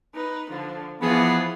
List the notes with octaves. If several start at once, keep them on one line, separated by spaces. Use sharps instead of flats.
D#4 B4
D3 F3
E3 F3 B3 F4 G#4